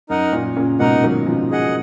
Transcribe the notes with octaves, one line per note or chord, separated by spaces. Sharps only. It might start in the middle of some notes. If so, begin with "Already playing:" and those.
F#2 D#4 A#4 D#5 F#5
F#2 A#2
A#2 C#3
G#2 B2 D#4 A#4 D#5 F#5
D#3 F#3
C#3 F3
G#4 D#5 F#5